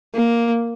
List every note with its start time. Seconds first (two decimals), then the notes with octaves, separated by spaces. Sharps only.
0.15 A#3